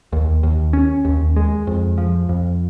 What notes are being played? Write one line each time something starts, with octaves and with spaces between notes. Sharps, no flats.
D#2
D#2
C#4
D#2
G#3
F2
F3
F2